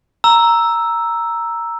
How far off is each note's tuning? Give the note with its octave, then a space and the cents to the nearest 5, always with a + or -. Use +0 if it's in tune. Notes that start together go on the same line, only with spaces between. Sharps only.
A#5 +0 E6 +0